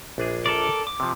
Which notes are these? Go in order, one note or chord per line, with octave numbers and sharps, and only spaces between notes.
A#1 D4 G#4
A4 A#4 D5
D6
C3 F3